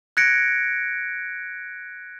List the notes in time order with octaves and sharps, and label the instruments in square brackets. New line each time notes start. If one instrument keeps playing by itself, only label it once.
[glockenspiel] F#6 G#6 A#6 C#7 D7